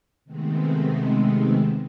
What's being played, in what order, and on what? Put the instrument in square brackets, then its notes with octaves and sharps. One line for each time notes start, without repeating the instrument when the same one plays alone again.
[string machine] C3 D#3 G#3 A3 B3 C4